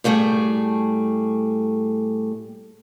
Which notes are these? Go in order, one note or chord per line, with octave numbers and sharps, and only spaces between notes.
A2 G3 A3 G#4